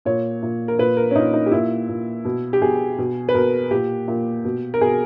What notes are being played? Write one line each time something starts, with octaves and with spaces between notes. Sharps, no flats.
A#2 C#5
A#2
A#4
A#2 B4
A#4
C#4
A#2 D#4
D#4
G4
A#2 E4
A#2
B2
G4
B2 G#4
B2
B4
B2 A#4
A#2 G4
A#2
B2
A#4
B2 G#4